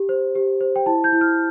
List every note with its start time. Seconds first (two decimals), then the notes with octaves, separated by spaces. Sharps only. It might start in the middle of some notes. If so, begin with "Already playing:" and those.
Already playing: G4
0.09 C5
0.35 G4
0.61 C5
0.76 G5
0.86 E4 A5
1.04 G6
1.12 E4
1.21 F6